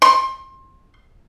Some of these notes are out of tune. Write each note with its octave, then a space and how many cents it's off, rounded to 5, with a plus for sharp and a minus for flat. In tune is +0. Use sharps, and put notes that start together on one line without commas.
C6 +25